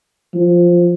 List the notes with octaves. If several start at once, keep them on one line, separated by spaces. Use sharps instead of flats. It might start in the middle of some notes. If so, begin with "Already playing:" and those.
F3